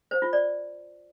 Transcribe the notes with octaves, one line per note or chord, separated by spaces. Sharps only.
C5
F4
D5